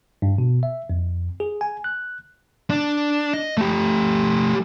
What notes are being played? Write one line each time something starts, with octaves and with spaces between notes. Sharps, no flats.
G2
B2
E5
F2
G#4
G#5
F#6
D4
D#5
A3 G4